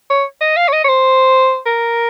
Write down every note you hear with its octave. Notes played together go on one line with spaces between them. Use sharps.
C#5
D#5
F5
C#5
D#5
C#5
C5
A#4